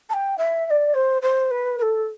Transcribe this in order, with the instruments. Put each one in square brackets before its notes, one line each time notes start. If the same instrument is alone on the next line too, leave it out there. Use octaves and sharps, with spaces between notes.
[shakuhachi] A5
G5
E5
E5
D5
C5
C5
B4
B4
A4